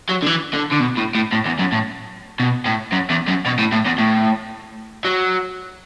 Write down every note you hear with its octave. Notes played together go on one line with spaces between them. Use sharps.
F#3
D3
E3
D3
D3
B2
A2
A2
A2
E2
F#2
A2
B2
A2
F#2
E2
F#2
B2
A2
A2
E2
A2
F#3